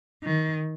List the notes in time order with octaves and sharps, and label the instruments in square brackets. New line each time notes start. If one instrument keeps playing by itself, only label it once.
[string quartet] D#3